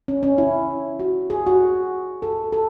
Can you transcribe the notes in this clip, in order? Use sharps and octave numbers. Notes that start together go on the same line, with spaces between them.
C#4
C#4
E4
F#4
G#4
F#4
A4
A4